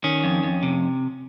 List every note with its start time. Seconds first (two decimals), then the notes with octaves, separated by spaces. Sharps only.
0.04 D#3 C#4
0.24 F2
0.43 F2
0.63 C3